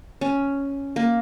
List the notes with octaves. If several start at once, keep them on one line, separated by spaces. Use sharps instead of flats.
C#4
A#3